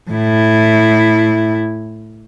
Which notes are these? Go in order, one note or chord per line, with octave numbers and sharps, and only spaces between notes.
A2 E4